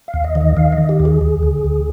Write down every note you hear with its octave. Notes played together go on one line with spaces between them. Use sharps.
F5
D#2
D#5
D#3
D#5
D#3 F5
D#5
D#3
G4
D#2
G#4
D2
D3
D2